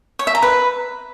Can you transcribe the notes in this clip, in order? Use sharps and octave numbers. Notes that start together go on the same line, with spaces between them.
C#5
E5
A#5
B4